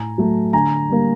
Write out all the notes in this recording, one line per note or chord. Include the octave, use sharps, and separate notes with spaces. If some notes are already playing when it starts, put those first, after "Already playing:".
Already playing: A2 G#5 A#5
F#3 A3
D3 G#5 A#5
G3 A#3